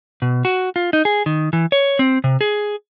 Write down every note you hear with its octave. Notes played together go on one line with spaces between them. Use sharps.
B2
F#4
F4
D#4
G#4
D#3
E3
C#5
C4
C3
G#4